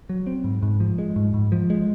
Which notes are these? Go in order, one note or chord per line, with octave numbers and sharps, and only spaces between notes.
F#3
C4
G#2
G#2
F3
G#3
G#2
G#2
F3
G#3